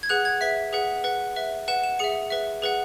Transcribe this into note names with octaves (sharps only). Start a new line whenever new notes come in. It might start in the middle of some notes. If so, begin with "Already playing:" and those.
G#6
G#4 B4 F#5 F#6
G#6
B4 E5 B6
G#4 B4 F#5
B4 F#5
B4 E5
B4 F#5 E7
E7
G#4 E5 C#7
B4 E5
G#4 B4 F#5